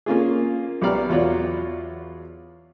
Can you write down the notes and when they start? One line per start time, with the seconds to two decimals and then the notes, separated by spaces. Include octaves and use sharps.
0.06 A#3 C#4 F4 G#4
0.82 B1 B3 G4 D5 A#5 F6
1.09 E2 F4 F#4 C#5 D5